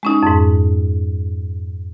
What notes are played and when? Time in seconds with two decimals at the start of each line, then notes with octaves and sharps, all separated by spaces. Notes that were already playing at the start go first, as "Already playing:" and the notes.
0.03 G#3 C#4 D#4
0.23 F2 G#2